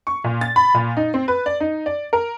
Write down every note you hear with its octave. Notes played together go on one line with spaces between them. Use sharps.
C#6
A#2
A6
B5
A#2
D#4
C4
B4
D5
D#4
D5
A#4